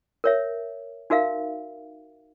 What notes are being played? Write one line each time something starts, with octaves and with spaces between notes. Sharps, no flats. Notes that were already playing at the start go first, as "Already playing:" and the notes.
A#4 C#5 E5
D#4 F#4 A#4 E5 F5